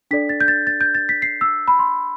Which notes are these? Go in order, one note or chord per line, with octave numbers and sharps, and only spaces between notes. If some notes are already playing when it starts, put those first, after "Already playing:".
D4 A4 D5 B6
A6
G6
A6
A6
G6
A6
B6
C7
E6
B5
C6